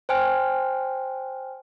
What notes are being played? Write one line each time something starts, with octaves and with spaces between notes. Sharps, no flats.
C5 G5 G#5 F6